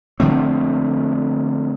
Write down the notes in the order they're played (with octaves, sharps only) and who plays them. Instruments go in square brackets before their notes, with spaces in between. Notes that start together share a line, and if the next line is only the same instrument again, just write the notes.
[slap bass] D3 F3 A3 C4